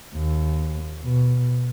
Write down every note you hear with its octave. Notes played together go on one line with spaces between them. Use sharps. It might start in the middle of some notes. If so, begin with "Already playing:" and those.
D#2
B2